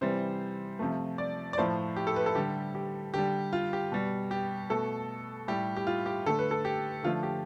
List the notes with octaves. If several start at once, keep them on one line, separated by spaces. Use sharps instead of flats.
C3 E3 G3 C5
C3 F3 A3
D5
D5
A2 F3 A3 C5
G4
A4
B4
A4
D3 G3 G4
G4
D3 G3 G4
F4
G4
B2 G3
G4
B2 A3 A4
A2 G3 G4
G4
F4
G4
D3 A3 A4
B4
A4
G4
D3 F3 A3 F4
G4